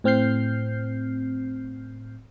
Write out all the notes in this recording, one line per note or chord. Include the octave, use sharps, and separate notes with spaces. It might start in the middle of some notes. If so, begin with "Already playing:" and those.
A2 C4 F6 G6 C7